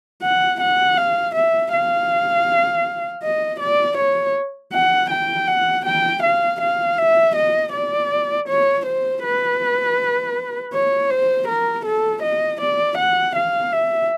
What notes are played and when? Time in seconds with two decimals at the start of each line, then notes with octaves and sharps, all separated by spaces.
0.23 F#5
0.61 F#5
0.98 F5
1.35 E5
1.74 F5
3.23 D#5
3.60 D5
3.97 C#5
4.73 F#5
5.10 G5
5.48 F#5
5.86 G5
6.23 F5
6.61 F5
6.98 E5
7.36 D#5
7.73 D5
8.48 C#5
8.86 C5
9.24 B4
10.74 C#5
11.11 C5
11.48 A#4
11.86 A4
12.23 D#5
12.61 D5
12.98 F#5
13.36 F5
13.73 E5